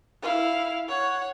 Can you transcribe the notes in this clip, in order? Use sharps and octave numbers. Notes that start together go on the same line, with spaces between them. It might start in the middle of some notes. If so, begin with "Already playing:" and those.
E4 F5
C#5 F#5